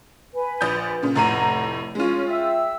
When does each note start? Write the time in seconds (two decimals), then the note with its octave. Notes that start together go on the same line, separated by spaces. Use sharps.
0.35 B4 G#5
0.61 A#1 D#6 G6
1.03 A#2 C#3
1.16 F1 A2 F#5 A#5 D#7
1.95 G#3 C#4 F4
2.29 E5 G5 E6